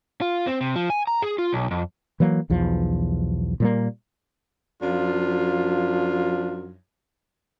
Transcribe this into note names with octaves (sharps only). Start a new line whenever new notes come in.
F4
C4
C3
F3
G#5
A#5
G#4
F4
B1
F2
E3 F#3 A#3
B1 E2 F3
A#2 G3 A#3
F#2 F3 D4 F4